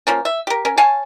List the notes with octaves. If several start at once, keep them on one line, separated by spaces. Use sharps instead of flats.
F3 A#3 C#4
E5
G4 A#4
C#4 A#4
C#5 F5 G#5 A5